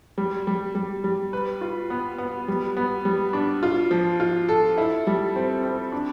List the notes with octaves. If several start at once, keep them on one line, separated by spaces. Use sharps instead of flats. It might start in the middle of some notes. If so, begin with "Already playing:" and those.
G3
G3
G3
G3
B4
F4
B3
B3
G3
B3
G3
D4
F4
F3
F4
A4
E4
G3
C4
C4
D4